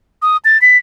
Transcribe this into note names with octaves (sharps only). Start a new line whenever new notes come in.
D#6
A6
B6